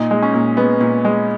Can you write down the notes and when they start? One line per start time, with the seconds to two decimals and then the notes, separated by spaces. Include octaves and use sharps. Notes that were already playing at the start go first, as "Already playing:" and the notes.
Already playing: A#2 D#4
0.11 G#3
0.22 C#4
0.34 A#2
0.57 G#3 B3
0.81 A#2
1.05 G#3